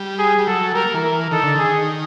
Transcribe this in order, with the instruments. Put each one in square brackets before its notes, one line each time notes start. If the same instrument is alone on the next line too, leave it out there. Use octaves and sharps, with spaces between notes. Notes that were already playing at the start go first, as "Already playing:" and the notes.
Already playing: [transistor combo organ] G3
[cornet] G#4
[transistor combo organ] G3
[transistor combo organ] F#3 [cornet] A4
[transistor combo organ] G3 [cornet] A#4
[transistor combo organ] A#3
E3
[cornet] A#4
[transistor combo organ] D#3 [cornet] A4
[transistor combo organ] D3
[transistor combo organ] D#3 [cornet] G#4